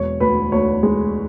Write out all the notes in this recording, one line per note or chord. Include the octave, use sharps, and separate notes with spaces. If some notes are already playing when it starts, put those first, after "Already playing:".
Already playing: E1 C#5
D2 B4
D2 C#5
G#3